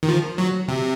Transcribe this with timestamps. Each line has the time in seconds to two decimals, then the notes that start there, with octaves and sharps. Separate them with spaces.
0.03 D#3
0.08 F3
0.38 F#3
0.68 C3